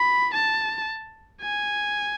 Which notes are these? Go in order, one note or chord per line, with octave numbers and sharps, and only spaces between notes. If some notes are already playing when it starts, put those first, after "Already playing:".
Already playing: B5
A5
G#5